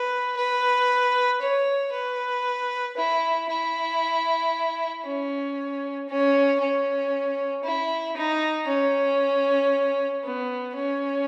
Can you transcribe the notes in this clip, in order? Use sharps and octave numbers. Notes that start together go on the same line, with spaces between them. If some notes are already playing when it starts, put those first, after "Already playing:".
Already playing: B4
B4
C#5
B4
E4
E4
C#4
C#4
C#4
E4
D#4
C#4
B3
C#4